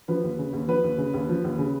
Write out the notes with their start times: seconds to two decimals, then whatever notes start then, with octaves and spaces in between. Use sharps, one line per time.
0.08 F3 B4
0.23 D#2
0.38 C#3
0.53 D#2
0.68 F3 B4
0.84 D#2
0.98 C#3
1.13 D#2
1.29 F3
1.44 D#2
1.59 C#3